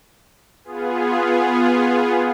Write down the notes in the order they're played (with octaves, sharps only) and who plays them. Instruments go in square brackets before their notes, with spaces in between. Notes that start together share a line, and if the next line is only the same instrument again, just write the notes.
[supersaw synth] B3 F4 G#4